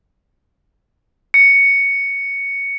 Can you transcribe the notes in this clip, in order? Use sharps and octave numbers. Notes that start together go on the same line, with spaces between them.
C#7